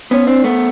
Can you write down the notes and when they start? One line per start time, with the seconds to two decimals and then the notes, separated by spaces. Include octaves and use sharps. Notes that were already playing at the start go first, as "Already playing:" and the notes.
0.11 B3 C#4
0.27 C4 D4
0.44 A3 B3